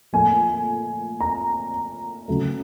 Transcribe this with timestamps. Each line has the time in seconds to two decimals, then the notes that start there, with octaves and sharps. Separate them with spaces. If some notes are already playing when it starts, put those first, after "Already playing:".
0.13 A#2 F3 A3 G#5
1.20 A#5
2.28 C#3 F#3 A3